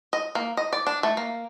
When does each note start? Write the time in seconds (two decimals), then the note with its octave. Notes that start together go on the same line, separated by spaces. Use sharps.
0.13 D#5
0.35 A#3
0.57 D#5
0.73 D5
0.87 D4
1.03 A3
1.17 A#3